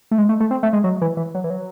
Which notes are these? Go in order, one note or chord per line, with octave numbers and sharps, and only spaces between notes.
A3
G#3
A3
A3
C4
A3
G#3
F#3
E3
E3
F#3
E3
F#3